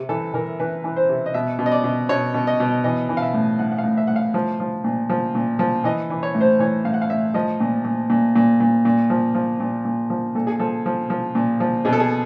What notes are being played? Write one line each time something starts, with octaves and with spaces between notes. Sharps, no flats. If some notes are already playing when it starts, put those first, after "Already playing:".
Already playing: C3
E3 A4
E3 A#4
E3 B4
E3
C5
C3
D#5
B2 E5
B2
D#5
D5
B2
B2 C#5
B2
D#5
B2
E3 D#5
E3
F5
E5
A2
A2 F#5
F#5
F5
A2
E5
A2 F#5
F5
F3
F3
A#2
F3
A#2
F3
E3 D#5
E3
C#5
A2
C5
E3 C#5
A2 F5
F#5
F5
A2 E5
F3 D#5
A#2
A#2
A#2
A#2
A#2
A#2
F3
F3
A#2
A#2
F3
A#2 A4
G#4
F3 A4
F3
F3
A#2
F3
B2 G#4
A4
G#4